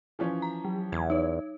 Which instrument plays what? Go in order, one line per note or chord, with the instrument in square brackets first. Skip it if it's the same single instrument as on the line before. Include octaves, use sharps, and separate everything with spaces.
[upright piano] E3 F3 C#4
[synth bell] A#5
F#3
[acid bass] E2 [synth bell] G#6
[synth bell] D#4 C#5